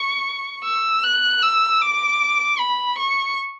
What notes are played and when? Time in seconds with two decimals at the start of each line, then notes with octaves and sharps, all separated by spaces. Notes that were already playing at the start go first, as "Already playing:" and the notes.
Already playing: C#6
0.64 E6
1.03 F#6
1.43 E6
1.81 D6
2.59 B5
2.98 C#6